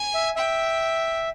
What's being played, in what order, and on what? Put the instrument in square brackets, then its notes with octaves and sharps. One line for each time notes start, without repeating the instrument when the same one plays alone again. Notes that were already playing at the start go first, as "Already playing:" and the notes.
Already playing: [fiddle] G#5
[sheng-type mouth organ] E5
[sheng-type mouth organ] E5 [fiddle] G5